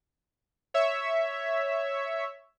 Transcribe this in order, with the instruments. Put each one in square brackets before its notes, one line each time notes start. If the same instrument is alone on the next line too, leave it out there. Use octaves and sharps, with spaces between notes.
[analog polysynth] C#5 E5